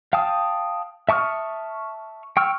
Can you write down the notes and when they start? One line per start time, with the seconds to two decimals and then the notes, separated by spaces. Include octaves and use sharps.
0.13 F5 G5 A5 D#6
1.09 E5 A5 C#6 D#6 F6
2.37 G5 C#6 E6 F6